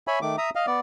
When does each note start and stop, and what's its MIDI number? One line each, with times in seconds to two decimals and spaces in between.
0.07 0.19 73
0.07 0.19 76
0.07 0.19 80
0.07 0.19 83
0.22 0.36 51
0.22 0.36 57
0.22 0.36 86
0.38 0.50 76
0.38 0.50 82
0.38 0.50 87
0.55 0.66 75
0.55 0.66 77
0.67 0.80 59
0.67 0.80 74